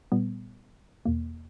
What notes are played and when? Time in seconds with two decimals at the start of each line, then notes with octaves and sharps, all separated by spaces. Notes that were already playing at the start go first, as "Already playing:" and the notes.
0.12 A#2 G3 B3
1.05 E2 B2 A#3